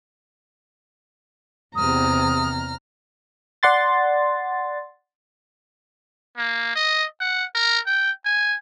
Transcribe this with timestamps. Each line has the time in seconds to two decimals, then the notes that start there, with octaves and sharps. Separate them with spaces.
1.76 E2 C3 A#5 D#6 F6
3.63 D5 F#5 C6 A6
6.37 A#3
6.76 D#5
7.20 F#5
7.55 A#4
7.86 G5
8.25 G#5